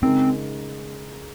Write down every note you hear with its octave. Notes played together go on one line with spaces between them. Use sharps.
C#3 G#3 C4 D#4 A#4